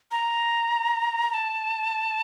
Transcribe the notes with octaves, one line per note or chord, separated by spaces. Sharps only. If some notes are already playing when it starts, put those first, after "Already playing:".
A#5
A#5
A5